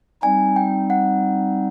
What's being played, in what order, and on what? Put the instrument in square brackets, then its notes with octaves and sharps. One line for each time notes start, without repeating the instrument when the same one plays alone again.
[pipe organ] G3 C4 D#4 [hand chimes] G#5
[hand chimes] G5
F#5